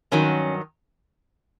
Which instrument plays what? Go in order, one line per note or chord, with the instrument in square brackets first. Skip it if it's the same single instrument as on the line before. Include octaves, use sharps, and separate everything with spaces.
[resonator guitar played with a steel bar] G2 D#3 F#3 C#4